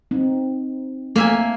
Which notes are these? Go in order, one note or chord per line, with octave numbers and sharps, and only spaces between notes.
C4 D#4
A3 A#3 E5 G#5